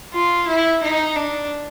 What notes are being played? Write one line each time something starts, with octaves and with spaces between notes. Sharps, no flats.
F4
E4
D#4
D4